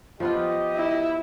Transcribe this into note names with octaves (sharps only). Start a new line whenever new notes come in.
F3 B3 F4 G4 D#5
E4